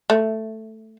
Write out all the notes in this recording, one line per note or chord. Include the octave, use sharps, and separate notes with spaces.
A3